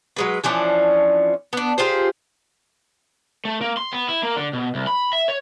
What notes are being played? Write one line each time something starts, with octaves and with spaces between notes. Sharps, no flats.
F#3 G#3 B4
E3 F3 C#4 D4
B3 D4
F4 G4 G#4 C5
A3
A#3
C6
B3
E4
A#3
D3
B2
C2
B5
E5
C#5